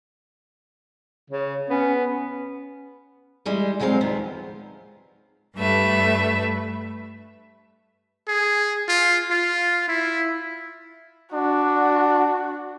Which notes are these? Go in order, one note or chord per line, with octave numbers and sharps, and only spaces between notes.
C#3
B3 C#4
E3 G3 G#3
D2 F#3 G#3 C4 A4 F5
D#2 D#3 F3 B3
G2 A3 B4 E5
G#4
F4
F4
E4
D4 F#4